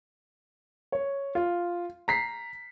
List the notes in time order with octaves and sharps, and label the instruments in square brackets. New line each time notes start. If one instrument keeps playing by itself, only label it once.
[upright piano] C#5
F4
A#5 B6 C7